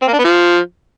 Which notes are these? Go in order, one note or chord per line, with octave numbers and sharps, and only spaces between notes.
C4
A#3
D4
B3
F3